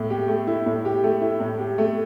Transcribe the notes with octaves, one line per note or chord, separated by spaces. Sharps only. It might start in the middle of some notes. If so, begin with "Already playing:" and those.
Already playing: A2 A3 E4
G4
A3
E4
A2
G4
A3
E4
A2
G4
A3